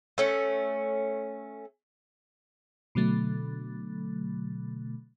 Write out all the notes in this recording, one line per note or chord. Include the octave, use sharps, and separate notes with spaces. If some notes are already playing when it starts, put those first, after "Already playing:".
A3 C#4
B2 D3 F#3 A3